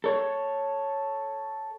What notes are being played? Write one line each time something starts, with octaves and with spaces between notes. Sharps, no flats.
A4 C#5